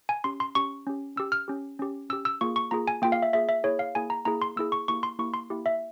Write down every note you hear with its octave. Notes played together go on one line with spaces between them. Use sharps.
G#5
C#4 G4 C6
C6
C#4 G4 C#6
C#4 G4
C#4 G4 E6
F6
C#4 G4
C#4 G4
C#4 G4 E6
E6
A#3 F4 G#4 C#6
C#6
A#3 F4 G#4 A#5
G#5
A#3 F4 G#4 G5
F5
E5
A#3 F4 G#4 E5
E5
A#3 E4 G#4 C#5
F5
A#3 E4 G#4 G#5
A#5
A#3 E4 G#4 A#5
C6
A#3 E4 G#4 E6
C#6
A#3 E4 G4 C#6
C6
A#3 E4 G4 C#6
C6
A#3 E4 G4
E5